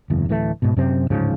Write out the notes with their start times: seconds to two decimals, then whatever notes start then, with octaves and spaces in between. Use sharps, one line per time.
0.10 F#1 E2
0.29 D1 E3 A3
0.62 G#2 B2
0.77 F#2 C3 C4
1.10 D1 G#2 C#3 F3